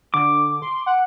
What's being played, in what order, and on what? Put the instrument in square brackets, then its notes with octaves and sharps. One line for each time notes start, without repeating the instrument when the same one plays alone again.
[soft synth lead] D3 [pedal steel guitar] D6
[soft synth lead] C6
F#5